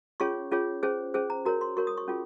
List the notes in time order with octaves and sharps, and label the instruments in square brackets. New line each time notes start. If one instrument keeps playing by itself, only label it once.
[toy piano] C#4 F4 G#4 C#5 C#6
C#4 F4 G#4 C#5
C#4 G#4 C5
C#4 G#4 C5
A#5
F#4 A#4 C#5 A#5
C6
F#4 A#4 C#5 C#6
D#6
C#6
C#4 F4 G#4